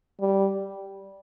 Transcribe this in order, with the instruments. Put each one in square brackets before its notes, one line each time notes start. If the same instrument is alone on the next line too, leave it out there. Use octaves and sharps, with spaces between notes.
[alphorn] G3